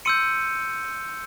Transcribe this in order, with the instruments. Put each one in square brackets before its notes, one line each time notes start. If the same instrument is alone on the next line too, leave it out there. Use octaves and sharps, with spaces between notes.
[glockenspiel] C6 E6 G6 C#7 D#7